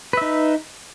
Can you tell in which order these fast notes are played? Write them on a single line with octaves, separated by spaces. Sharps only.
B4 E5 D#4